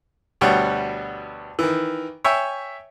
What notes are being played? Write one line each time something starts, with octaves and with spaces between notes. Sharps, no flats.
D2 B2 G3 C#5 F#5 G5
D#3 E3
C#5 E5 G5 G#5 C#6 E6